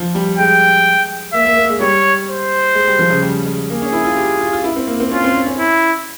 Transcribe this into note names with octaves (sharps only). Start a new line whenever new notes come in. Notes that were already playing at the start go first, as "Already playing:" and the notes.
Already playing: F3
G3
G#3 G5
A#3 E5
A#3
A#3
G#3
G3 C#5
C5
G#3
G3
F3
C#3
G3
G#3
A#3 G#4
C#4
E4
F4
G4
F4
F4
E4
C4
A#3
C4
C#4 F4
C4
C#4
C#4
E4